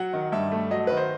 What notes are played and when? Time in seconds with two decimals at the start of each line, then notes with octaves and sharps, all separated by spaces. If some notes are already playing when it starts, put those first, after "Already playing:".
Already playing: F#3 F#5
0.13 D#3
0.32 G2 E5
0.52 A3
0.71 F#3 D#5
0.87 D#3 B4
0.97 C5